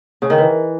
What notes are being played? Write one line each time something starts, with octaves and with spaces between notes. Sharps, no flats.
C#3
D#3
E3